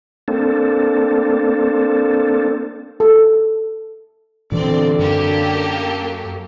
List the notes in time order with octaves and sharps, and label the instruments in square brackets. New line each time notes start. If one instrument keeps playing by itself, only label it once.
[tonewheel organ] A#3 C4 D4 A4
[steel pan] A4
[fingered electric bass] A#2 E3 D4 [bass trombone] D3 [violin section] C4 D5
[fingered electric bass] F#2 [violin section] A#3 G4 A4